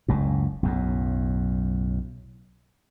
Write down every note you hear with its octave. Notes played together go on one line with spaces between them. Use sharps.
F#1 C#2 A2
B1 F#2 A2